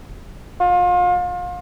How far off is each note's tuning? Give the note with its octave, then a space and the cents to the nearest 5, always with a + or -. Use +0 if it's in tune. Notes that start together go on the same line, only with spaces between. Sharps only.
F4 +35